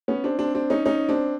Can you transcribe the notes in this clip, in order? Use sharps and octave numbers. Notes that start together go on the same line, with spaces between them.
B3 C#4
C4 D4
C4 D4
C4 D4
C#4 D#4
C#4 D#4
C4 D4